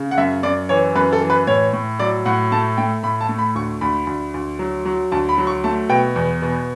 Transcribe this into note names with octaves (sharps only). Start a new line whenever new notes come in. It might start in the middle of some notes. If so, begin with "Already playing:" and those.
Already playing: C#3
F#5
F#2 E5
F#2 D5
E3 C#5
F#2 B4
A4
E3
B4
A2 C#5
A2
F#3 D5
A2 F#5
A3 A5
A3 G5
A2 B5
A5
A3
B5
D2 C#6
D2 B5
D2
D2
F#3
F#3
D2 A5
B5
F#3
C#6
A3 A5
B2 G5
E2
B2